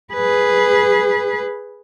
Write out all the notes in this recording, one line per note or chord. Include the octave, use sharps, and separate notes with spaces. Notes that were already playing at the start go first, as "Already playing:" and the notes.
G#4 B4